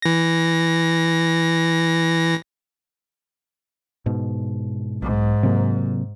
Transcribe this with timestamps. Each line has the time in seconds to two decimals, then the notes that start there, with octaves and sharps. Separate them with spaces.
0.02 E3 A#6
4.06 G#2 B2
5.02 B1 G#2
5.43 C3 F#3 A#3